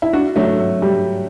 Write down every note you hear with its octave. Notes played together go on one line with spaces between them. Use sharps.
E4
D4 F#4
F#3 A3
F#3
G3